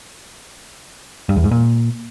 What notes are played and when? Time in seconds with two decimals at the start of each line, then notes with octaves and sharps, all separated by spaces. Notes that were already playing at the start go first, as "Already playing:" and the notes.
1.29 G2
1.36 E2
1.44 G#2
1.51 A#2